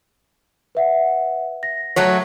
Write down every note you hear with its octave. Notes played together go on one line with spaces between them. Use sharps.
B4 E5 F#5
A#6
F#3 A3 C#5